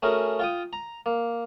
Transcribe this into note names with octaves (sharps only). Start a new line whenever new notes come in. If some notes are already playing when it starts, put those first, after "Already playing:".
A3 C#4 F#4 G#4 A#4
F4 G5 D#6
A#5
A#3